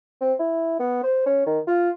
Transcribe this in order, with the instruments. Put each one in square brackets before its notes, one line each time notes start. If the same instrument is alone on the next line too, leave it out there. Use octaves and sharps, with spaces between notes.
[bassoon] C4
E4
B3
C5
C#4
D#3
F4